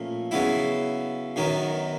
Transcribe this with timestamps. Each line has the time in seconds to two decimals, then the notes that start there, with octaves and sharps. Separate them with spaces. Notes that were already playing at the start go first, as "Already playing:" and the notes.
Already playing: A#2 F3 A3 C#4
0.31 C#3 F#3 B3 E4
1.36 F#2 D#3 F#3 B3